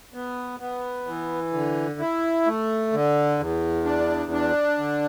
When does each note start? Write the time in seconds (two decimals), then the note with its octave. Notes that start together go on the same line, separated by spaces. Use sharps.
0.14 B3
0.60 B3
1.07 E3
1.53 D3
2.00 E4
2.46 A3
2.93 D3
3.39 E2
3.85 D4
4.32 D4
4.78 D3